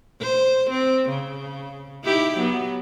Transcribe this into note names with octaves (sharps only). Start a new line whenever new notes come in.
C5
C4
C#3
D#4 E4 G4
F#3 B3